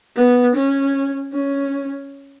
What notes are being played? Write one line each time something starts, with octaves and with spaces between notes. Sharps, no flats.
B3
C#4
C#4